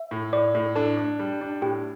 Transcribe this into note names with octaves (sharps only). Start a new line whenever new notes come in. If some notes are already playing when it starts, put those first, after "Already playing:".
Already playing: E5
A2
A2 D5
A2
D4 A4
D4
G3
D4
A2 G4